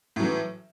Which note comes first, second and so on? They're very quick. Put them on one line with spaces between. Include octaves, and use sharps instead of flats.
A2 F#3 E3